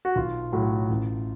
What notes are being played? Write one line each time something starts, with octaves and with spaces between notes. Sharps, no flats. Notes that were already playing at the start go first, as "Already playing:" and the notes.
F#4
B1 F4
A2 F#3
A1